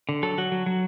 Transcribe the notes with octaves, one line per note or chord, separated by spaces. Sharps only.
D3
F#3 A4
F#3 F#4
F#3
F#3